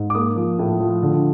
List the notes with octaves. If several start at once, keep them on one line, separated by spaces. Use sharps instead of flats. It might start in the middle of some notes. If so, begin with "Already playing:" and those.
Already playing: G#2
D6
A#3 D#6
F3
A2
F3
D3